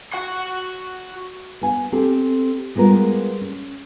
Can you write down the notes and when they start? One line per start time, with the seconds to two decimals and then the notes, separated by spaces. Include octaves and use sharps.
0.14 F#4 F#5
1.61 B3 G#5
1.92 C4 G4 A4
2.75 G3 G#3 B3 F4 A#4
3.41 C#4